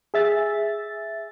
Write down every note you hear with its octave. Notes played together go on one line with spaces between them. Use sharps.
G#4 E5 A6